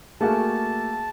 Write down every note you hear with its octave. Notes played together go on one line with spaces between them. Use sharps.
A3 A#3 F#4 G#4 A5